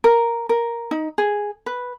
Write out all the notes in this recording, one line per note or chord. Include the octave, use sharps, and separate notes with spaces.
A#4
A#4
D#4
G#4
B4